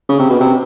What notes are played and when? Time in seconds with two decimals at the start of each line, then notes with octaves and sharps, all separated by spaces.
0.09 C#3
0.19 C3
0.30 B2
0.40 C3